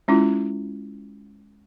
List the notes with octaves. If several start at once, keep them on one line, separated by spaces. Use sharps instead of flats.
G#3 C#4 E4 F4